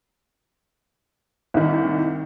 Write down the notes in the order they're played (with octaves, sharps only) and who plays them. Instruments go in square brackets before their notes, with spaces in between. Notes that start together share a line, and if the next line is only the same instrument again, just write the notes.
[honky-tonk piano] C2 D#3